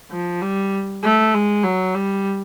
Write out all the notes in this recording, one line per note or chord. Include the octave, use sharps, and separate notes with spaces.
F3
G3
A3
G#3
F#3
G3